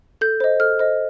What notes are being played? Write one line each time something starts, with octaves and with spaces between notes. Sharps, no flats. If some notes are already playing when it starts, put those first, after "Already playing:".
A4 G6
C5 D#5
A4 F6
C5 D#5